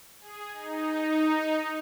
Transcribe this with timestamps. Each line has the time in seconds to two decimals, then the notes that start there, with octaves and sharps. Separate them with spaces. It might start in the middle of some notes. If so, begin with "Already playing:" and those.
0.20 G#4
0.52 D#4